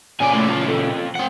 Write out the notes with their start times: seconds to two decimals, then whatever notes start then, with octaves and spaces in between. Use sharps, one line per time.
0.20 A#2 C#3 D5 G#5
0.34 A2
0.50 F4 A5
0.66 F3 A4
1.15 C4 F#5